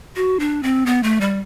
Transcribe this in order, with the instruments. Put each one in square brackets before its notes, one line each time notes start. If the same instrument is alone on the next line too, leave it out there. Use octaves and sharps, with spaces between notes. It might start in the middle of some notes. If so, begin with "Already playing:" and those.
[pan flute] F#4
D4
C4
B3
A3
G3